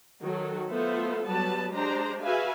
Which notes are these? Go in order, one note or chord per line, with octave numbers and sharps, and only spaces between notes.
D#3 F#3 F#4 A4
A3 B3 F4 A4 C5 E5
F#3 G3 B3 B4 A5
G#3 D4 G4 C5 A#5
F#4 G#4 B4 E5 F5 G#5